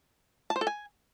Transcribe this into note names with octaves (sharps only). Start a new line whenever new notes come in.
A5
C5
A4
G#5